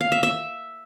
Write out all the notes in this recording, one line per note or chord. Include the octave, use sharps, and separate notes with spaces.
F5
E5
E5